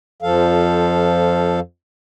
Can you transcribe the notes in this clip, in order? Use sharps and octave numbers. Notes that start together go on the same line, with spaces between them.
F2 F3 A4 F5